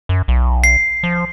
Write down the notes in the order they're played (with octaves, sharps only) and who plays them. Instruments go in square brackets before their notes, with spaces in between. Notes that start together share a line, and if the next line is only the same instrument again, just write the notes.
[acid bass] F#2
B1
[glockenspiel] C7
[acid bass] F3